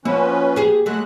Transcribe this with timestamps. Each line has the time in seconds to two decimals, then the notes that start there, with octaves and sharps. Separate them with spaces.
0.05 F3 A#3 C#4 F#4 B4
0.56 G4 G#4
0.86 F#3 G#3 A3 F#6